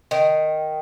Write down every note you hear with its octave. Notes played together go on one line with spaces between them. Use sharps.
D#3